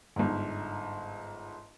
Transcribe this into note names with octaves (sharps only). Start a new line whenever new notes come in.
G1 G#2